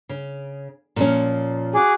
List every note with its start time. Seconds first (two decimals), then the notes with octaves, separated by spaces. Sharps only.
0.09 C#3
0.96 A#2 F3 C#4
1.74 F#4 G#4 D6